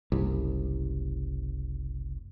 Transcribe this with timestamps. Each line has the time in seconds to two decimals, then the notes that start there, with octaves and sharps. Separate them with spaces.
0.12 F#1 C2